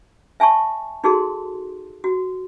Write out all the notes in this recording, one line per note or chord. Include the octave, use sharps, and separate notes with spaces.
E5 G#5 A5 C#6
D#4 F#4 G#4 A4 C6
F#4